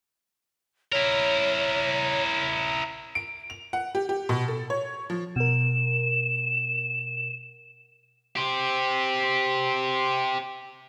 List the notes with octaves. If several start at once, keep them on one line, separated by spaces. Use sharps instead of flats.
E4 A#4 C#5
D7
F7
F#5
G4
G4
B2
A4
C#5
F3
B2 A#4 E7
G4 C5